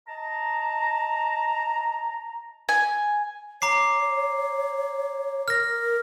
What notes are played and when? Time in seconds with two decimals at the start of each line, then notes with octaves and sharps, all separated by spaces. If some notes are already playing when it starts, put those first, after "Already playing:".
0.07 D#5 A5 A#5
2.69 G#5
3.62 C#5 A#5 D6 C7
5.48 A#4 F6 A#6